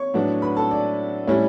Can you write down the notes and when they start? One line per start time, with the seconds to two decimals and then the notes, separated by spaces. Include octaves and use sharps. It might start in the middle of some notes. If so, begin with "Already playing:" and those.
Already playing: C#5 C#6
0.14 A2 F#3 B3 D4
0.42 B4 B5
0.57 A4 A5
0.71 D5
1.27 A2 G3 C#4 E4 C#5